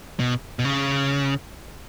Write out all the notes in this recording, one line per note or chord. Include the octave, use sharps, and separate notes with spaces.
B2
B2
C#3